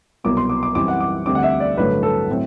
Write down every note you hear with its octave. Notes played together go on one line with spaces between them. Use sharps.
C2 B2 F#3 B3 D6
C6
D6
D6
F#2 E3 G3 C4 D6
F#5
D6
D2 D3 G3 C4 D6
F#5
E5
D5
A1 G2 D3 F#3 A3 B4
A4
A2 F#3 C4